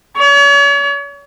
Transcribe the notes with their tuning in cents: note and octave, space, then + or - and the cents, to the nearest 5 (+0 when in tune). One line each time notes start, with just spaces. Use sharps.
C#5 +40